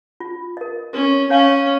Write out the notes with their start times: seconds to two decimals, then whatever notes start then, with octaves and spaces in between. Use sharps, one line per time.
0.20 F4
0.57 A#4 D#5
0.93 C#4 A#4
1.30 C#4 C#5 F5 G#5